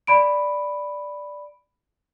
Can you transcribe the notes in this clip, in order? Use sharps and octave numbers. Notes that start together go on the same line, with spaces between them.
D5 B5 D7